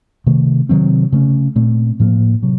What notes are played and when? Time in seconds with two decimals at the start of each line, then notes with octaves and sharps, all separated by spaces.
0.27 C3 D#3 A3
0.69 C3 D#3 F#3 C4
1.12 C#3 A3 C#4
1.56 A#2 A3 C4
2.00 A2 F3 A#3
2.42 C3 F#3